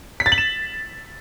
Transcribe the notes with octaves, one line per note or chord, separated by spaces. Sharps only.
B6
A6
F#7
E7